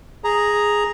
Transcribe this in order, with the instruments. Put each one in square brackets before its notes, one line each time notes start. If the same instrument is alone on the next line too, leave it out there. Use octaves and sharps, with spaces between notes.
[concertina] G#4 A#5